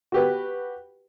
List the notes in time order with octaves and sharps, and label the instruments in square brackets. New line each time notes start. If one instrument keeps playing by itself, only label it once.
[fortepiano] F#4 G4 B4